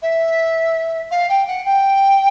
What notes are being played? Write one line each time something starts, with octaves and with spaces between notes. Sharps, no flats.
E5
F5
G5
F#5
G5